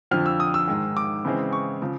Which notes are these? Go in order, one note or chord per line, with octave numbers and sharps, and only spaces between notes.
F2 D3 F3 F6
E6
D#6
E6
G#2 D#3 G#3
D6
C#3 E3 G#3 C4
C#6
C#3 F3